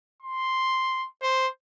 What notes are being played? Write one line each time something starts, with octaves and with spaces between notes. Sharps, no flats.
C6
C5